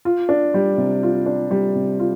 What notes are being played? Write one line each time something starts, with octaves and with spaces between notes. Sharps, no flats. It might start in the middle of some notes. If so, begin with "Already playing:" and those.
F4
D4
G3
C3
F4
D4
G3
C3
F4